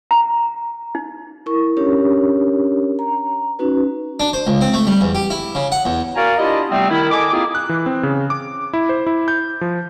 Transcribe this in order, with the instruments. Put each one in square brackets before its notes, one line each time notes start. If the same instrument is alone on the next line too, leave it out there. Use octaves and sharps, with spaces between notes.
[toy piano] A#5
D#4
[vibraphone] E4 A#4 C#6
C#4 D4 G4 A#4 C#5
A#5
C#4 D#4 F#4 B4
[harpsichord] D4
C5
C#2
C4
A3
G3
E2
G4
E4
C#3
F#5
E2
[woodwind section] F#4 A#4 D5 F5 G#5 A#5
D4 E4 F4 G4 D5 D#5
C3 G3 A3 B3 C4
D#3 E4
A4 D#5 G#5 D6
A#3 C4 E4 F4 G#4
[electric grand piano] F#6
E3
C4
C#3
D6
E4
C5
E4
G6
F3